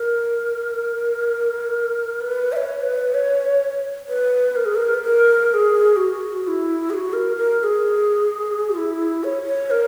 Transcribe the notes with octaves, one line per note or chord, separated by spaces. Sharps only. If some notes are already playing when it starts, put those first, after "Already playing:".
Already playing: A#4
B4
E5
C#5
B4
C#5
B4
A#4
G#4
A#4
B4
A#4
A#4
G#4
F#4
F#4
E4
G#4
F#4
A#4
A#4
A#4
G#4
E4
C#5
C#5
A#4